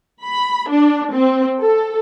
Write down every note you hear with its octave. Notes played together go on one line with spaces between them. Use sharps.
B5
D4
C4
A4